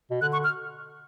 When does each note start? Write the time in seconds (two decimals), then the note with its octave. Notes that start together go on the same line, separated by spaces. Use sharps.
0.10 B2
0.21 D3 F#6
0.33 C#6
0.44 F6